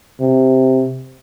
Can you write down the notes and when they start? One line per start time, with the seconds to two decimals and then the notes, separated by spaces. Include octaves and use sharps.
0.20 C3